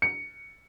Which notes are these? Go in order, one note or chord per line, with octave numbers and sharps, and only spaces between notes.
C#7